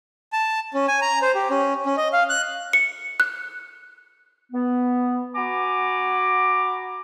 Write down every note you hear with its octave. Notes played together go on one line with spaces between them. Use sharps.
A5
C#4
G#5
A#5
C5
G4
C#4
C#4
D#5
F5
F#6
C#7
F#6
B3
F#4 F#5 G#5 A#5 B5 D6